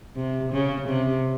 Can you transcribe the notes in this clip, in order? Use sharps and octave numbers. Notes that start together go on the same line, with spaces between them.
C3
C#3
C3